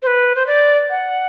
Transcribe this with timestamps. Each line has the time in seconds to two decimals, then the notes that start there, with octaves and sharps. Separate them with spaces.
0.02 C5
0.07 B4
0.36 C5
0.47 D5
0.90 F#5